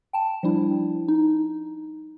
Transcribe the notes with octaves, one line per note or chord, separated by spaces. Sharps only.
G5 A5
F3 G3 D4 E4
D#4